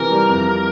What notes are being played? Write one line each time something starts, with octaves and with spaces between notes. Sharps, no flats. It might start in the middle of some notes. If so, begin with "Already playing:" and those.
Already playing: C3 E3 A#4
G3
F2
C3